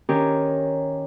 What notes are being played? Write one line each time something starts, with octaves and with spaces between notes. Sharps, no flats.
D#3 C#4 D4 G4 A#4 C#5